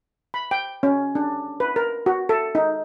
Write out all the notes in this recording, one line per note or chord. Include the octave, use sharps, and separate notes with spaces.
B5
G5
C#4
D4
B4
A#4
F#4
A4
D#4